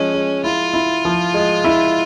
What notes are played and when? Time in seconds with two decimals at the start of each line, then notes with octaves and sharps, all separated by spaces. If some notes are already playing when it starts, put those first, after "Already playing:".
Already playing: F3 G#3 C#4
0.14 G#3
0.44 E4 F4
0.74 E4
1.05 F3
1.34 G#3
1.64 E4